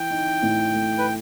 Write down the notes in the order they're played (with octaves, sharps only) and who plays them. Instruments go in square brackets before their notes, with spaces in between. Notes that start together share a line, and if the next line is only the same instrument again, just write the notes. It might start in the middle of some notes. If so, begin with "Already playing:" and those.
Already playing: [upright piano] E3 [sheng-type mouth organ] G5
[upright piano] D#4
A2
A3
[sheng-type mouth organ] B4